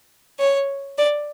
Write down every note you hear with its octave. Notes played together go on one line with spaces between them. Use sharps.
C#5
D5